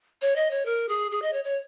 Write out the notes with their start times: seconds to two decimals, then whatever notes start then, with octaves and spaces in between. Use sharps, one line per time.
0.22 C#5
0.36 D#5
0.51 C#5
0.65 A#4
0.88 G#4
1.11 G#4
1.22 D#5
1.33 C#5
1.44 C#5